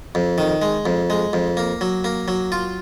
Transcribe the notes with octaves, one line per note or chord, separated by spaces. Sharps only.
F2
D#3
G#3
F2
G#3
F2
A#3
F#3
A#3
F#3
F4